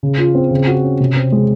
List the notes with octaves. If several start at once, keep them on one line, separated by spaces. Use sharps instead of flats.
C#3
F4
C4
C#3
F#4
C#4
C3
C4
G#3